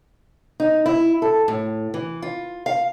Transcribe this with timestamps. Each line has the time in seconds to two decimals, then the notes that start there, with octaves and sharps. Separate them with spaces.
0.60 D#4
0.86 E4
1.22 A4
1.48 A2
1.94 E3
2.22 F4
2.66 F5